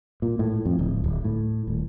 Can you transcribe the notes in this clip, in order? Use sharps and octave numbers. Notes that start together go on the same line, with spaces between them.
A#2
A2
F2
D1
D1
A2
D#1